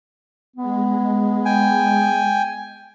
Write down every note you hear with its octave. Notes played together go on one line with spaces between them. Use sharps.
G#3 B3
G5 G#5